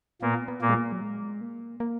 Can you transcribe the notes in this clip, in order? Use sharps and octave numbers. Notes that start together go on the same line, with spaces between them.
A#2 A#3 B3
B3
A#2 A#3
G#3
A#3
F#3
G#3
A#3
A#3